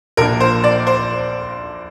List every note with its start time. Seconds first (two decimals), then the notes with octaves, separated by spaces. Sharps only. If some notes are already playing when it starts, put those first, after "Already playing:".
0.17 A#1 A#2 A#3 D4 A#4
0.40 C5
0.64 D5
0.87 C5